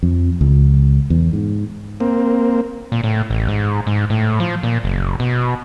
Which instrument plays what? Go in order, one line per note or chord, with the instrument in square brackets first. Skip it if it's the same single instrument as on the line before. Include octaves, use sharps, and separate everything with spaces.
[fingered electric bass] F2
C#2
E2
G#2
[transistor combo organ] A#3 C4
[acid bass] A#2
A2
A1
G#2
G#2
A2
F3
A#2
F#1
B2